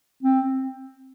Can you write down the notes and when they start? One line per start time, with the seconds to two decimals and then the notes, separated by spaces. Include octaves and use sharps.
0.23 C4